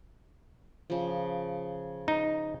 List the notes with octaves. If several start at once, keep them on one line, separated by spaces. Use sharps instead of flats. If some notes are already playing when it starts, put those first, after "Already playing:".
C#3 F3
D#4